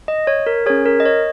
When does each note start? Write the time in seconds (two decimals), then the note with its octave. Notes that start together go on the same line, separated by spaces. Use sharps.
0.08 D#5
0.27 C#5
0.47 A#4
0.66 C#4 G#4 C#5
0.86 A#4
1.00 D#5
1.05 C#5